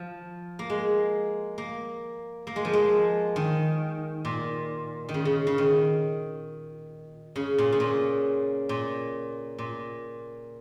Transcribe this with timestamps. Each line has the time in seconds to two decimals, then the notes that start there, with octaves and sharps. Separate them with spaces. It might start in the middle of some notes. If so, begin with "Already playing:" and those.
Already playing: F3
0.59 A#3
0.70 G#3
1.58 A#3
2.47 A#3
2.56 G#3
2.65 F3
2.73 G#3
3.36 D#3
4.25 A#2
5.09 D#3
5.14 C#3
5.25 C#3
5.47 C#3
5.58 D#3
7.36 C#3
7.58 A#2
7.72 C#3
7.80 A#2
8.69 A#2
9.58 A#2